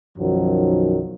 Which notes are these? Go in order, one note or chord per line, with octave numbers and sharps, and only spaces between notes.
B1 F#2 D#3 F3 F#3